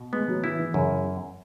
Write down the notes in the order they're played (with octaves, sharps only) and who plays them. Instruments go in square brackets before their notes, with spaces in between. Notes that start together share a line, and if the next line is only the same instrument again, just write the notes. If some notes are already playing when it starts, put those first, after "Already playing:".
Already playing: [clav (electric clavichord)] B2
[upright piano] G#3 [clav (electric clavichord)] B3
[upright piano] F#3
[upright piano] E3 [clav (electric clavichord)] E4
[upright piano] E3
[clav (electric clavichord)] F#2 [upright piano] C#3